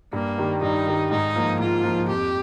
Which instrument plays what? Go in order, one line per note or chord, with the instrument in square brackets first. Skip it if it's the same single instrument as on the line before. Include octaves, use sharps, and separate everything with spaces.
[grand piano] G2 [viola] A#3
[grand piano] D#3 G3
[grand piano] G2 [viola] D#4
[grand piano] D#3 G3
[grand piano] G#2 [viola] D#4
[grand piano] F3 A#3
[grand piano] G#2 [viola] F4
[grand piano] F3 A#3
[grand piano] F2 [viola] G4